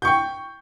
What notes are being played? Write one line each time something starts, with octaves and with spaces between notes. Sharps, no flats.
G5 C#6 G6